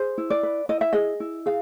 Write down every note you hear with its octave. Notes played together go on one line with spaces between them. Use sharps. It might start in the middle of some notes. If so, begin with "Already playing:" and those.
Already playing: G#4 C5
E4
D5
B4
E4 D#5
E5
G#4 D#5
E4
G#4 F5